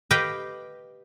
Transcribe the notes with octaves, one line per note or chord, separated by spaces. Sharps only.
G4 B4 D#5 F5 G5